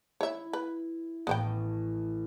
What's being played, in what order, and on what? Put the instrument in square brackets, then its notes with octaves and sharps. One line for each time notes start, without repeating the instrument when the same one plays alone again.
[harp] E4 [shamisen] C#5 E5
[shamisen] B4
[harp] A1 A2 [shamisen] B3 C5 G5